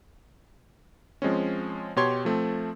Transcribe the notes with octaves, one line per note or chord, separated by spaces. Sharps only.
F3 G#3 C4 C#4
B2 G4 C#5 C6 G#6
F3 A3 C4